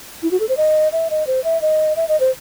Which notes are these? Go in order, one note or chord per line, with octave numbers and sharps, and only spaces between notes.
E4
F#4
A4
C5
D#5
E5
D#5
C5
E5
D#5
E5
D#5
C5